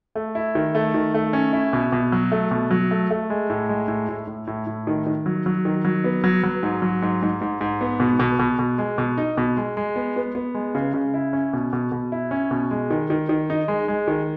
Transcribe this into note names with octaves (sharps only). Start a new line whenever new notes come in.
A3
E4
D#3
A3
D#3
A3
C#4
E4
B2
B2
F#3
A3
B2
F#3
A3
A3
G#3
A2
G#3
A2
A2
A2
A2
A2
D#3
D#3
F#3
F#3
D#3
F#3
B3
F#3
F#3
G#2
F#3
G#2
G#2
G#2
G#2
B3
B2
B2
B2
B2
G#3
B2
D#4
B2
G#3
G#3
B3
B3
B3
G#3
C#3
C#3
E4
C#4
B2
B2
B2
E4
C#4
B2
G#3
D#3
D#3
D#3
D#4
G#3
G#3
D#3